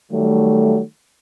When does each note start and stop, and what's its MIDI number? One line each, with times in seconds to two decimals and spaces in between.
0.12 0.81 51
0.12 0.81 54
0.12 0.81 55
0.12 0.81 57